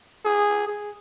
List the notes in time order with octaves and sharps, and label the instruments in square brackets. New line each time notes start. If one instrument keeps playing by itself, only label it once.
[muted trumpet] G#4
G#4